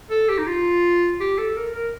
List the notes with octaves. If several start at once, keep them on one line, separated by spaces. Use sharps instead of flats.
A4
G4
D#4
F4
G4
A4
A#4
A#4